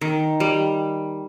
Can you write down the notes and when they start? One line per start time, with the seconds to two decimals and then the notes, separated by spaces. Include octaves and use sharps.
0.01 D#3
0.40 G3